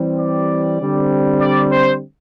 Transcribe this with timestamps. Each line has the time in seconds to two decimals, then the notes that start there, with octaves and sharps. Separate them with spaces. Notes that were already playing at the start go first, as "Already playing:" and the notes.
Already playing: E3 G3 C4
0.19 D5
0.80 D3 G3 C4
1.41 D5
1.71 C5